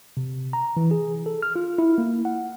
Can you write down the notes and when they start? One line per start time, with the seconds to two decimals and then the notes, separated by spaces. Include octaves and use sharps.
0.17 C3
0.53 A#5
0.77 E3
0.91 G#4
1.26 A4
1.43 F6
1.56 F4
1.78 E4
1.98 A#3
2.25 F#5